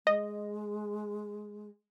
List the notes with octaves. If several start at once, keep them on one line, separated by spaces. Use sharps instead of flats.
G#3 D#5